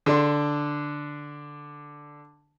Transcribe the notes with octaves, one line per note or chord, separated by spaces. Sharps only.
D3 D4 C6